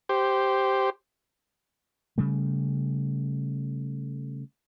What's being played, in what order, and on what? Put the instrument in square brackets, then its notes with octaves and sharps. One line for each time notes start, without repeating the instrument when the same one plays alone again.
[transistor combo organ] G4 C5
[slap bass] C#3 G3 A3